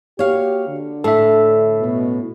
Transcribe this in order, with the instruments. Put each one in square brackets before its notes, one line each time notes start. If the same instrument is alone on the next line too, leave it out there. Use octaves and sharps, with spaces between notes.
[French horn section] A#3 F#4 G4 [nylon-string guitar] C#5 F5
[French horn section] D3
[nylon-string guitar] A2 [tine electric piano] A4 E5
[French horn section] F#2 B2